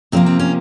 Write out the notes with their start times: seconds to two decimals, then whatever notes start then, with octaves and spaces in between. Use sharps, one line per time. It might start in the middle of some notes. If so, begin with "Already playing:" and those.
0.12 C3 F3 A#3 C4
0.26 C4
0.40 C#4